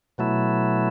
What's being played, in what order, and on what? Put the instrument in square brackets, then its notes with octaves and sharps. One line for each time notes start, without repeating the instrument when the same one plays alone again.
[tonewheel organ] B2 F#3 A3 E4